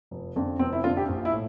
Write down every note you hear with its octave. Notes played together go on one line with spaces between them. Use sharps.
F1
F2 D3
F1 C4
E4
F2 D3 F4
G4
A#1
E4
A2